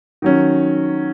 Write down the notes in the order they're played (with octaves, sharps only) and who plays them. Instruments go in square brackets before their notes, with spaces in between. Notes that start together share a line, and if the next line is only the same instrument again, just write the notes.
[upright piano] D#3 F#3 C#4